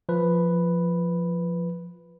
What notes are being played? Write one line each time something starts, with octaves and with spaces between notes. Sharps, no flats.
F3 B4